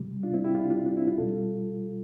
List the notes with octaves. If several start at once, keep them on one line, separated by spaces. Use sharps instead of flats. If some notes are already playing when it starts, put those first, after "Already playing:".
Already playing: C3 G3
D4 F4
C4 E4
E4 G4
D4 F4
D4 F4
D4
C4 E4
D4 F4
B2 G3 F4 A4